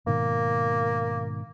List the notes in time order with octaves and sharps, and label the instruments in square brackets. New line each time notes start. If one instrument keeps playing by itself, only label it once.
[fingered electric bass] G#2 B2 D#3 [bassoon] A#3